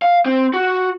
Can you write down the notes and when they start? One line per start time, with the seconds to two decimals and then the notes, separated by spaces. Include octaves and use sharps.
0.02 F5
0.26 C4
0.54 F#4